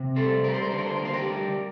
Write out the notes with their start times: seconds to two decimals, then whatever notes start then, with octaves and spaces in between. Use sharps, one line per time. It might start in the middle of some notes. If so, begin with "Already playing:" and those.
Already playing: C3
0.16 G3 A4 C5
0.44 G3 A#4
0.54 C5
0.62 A#4
0.70 D3 C5
0.78 A#4
0.87 C5
0.96 A#4
1.01 A#3 C5
1.13 G4 A#4
1.30 G3